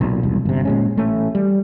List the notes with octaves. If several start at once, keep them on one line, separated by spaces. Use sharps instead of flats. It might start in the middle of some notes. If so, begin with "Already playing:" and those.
B1 A#2
E1 C2
G1 C3
A#2 G#3 C#4
A1 A3 C#4
G3